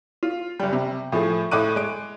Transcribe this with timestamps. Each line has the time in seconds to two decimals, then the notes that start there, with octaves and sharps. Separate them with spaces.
0.23 F4
0.60 F#1 G3
0.73 C3
1.12 A2 F3 A3 G#4
1.51 A2 A4 D#5 D6 F#6 D#7
1.76 G#3 D7